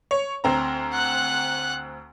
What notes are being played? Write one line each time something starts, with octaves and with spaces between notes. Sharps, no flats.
C#5
D2 C4 A#5
F#5 F#6